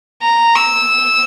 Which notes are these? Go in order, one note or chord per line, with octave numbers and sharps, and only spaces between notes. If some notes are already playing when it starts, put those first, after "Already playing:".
A#5
E6